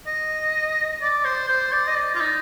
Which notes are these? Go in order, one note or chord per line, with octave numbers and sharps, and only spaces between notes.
D#5
D5
C5
C5
D5
D#5
D5
F4
D#4